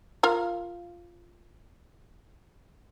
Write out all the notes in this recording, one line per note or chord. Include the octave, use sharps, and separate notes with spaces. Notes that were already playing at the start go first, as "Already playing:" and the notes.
F4 A#4 F5